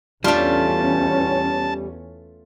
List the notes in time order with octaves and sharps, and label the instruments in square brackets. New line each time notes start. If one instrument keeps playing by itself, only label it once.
[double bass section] E2 C#4 [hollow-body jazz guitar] G3 D4 [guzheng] A3 F4 [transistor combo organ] A5